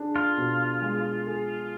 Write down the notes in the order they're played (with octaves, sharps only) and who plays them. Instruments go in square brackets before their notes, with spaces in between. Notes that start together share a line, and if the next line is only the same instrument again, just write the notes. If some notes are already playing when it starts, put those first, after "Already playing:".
Already playing: [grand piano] D4 G#4
[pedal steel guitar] F4
[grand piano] B2
G#3
G#4